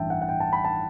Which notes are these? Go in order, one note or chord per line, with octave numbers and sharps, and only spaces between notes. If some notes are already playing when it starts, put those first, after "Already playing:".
Already playing: A1 G2 E3 E5 G5 A5
F#5
F#5
G5
A5
B5
A5